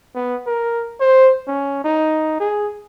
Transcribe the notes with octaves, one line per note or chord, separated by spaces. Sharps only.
B3
A#4
C5
C#4
D#4
G#4